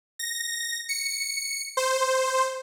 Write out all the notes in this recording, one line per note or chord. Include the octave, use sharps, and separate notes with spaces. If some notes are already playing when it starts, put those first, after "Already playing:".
A#6
C#7
C5